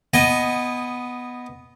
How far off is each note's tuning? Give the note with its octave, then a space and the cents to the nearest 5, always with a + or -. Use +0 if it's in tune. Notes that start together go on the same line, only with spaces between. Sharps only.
B3 +0 D#5 +0 G#5 -25